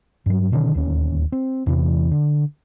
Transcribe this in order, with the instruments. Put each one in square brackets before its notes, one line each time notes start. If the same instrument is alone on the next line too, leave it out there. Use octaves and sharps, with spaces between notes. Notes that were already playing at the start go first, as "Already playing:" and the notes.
[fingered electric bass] G2 F#3
B2 D3 D#3 C#4
D1 D#2 C#4
C4
E2 C3 E3
D3